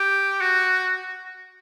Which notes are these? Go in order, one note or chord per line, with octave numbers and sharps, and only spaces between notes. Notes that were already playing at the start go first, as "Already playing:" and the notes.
Already playing: G4
F#4